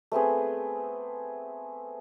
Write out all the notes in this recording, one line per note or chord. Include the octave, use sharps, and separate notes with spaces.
A3 B3 C4 G#4